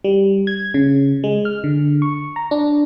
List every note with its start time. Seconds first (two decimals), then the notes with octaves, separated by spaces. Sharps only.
0.04 G3
0.47 G#6
0.74 C#3
1.24 G#3
1.45 F6
1.64 D3
2.02 C#6
2.36 A#5
2.51 D4